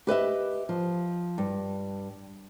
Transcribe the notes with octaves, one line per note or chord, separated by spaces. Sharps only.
G4 B4 D#5 E5
F3
G2